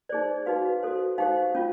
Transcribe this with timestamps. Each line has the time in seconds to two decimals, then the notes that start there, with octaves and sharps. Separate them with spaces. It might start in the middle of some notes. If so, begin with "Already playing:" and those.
0.09 D#4 G#4 C5 D5
0.46 D#4 F#4 B4 F5
0.83 F#4 A4 C5
1.18 D#4 G4 C5 F5
1.55 C#4 F4